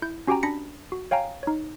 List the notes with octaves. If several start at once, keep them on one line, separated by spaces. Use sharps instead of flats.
E4 G6
C#4 F#4 G4 G5 G#5 A#5
D4 B5 A#6 B6 C#7
F#4
C#5 F5 G5 G#5 A#5
D#4 C#5